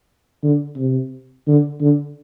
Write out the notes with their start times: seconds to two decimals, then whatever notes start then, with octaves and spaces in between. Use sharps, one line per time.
0.43 D3
0.77 C3
1.47 D3
1.81 D3